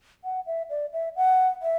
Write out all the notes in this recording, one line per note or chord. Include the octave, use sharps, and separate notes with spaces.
F#5
E5
D5
E5
F#5
E5